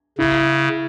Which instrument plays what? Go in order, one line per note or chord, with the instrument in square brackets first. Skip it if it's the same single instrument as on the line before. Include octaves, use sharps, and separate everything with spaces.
[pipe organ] C#3 [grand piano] E4